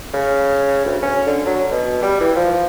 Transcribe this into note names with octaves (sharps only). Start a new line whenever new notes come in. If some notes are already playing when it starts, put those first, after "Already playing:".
C#3
D2
C#4
D3
F#3
B2
G3
E3
F3